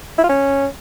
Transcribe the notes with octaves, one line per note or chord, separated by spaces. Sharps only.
E4
F4
C#4